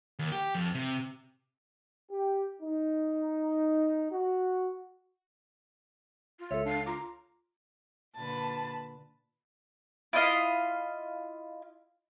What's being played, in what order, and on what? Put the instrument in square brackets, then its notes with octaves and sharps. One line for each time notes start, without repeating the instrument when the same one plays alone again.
[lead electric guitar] D#2
G4
F2
C3
[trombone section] G4
D#4
F#4
[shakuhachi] F4
[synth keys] C#2 [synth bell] A4 C#5 [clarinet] E5
[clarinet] D4 [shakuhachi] F5
[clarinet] F4 [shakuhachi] A#5 [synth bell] D6
[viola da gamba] A#2 D3 B4 [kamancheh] A5
[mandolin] E4 F4 D#5 F5